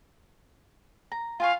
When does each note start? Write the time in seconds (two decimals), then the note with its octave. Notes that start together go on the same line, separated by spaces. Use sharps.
1.12 A#5
1.40 F4 F5 G#5 C#6